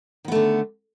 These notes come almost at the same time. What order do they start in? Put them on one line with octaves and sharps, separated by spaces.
D#3 B3 A3 D3